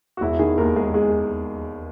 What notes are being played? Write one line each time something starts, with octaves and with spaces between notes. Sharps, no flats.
F#4
E1 E4
D#3 G#4
D#2 A#4
G#3 G#4
G#3 G#4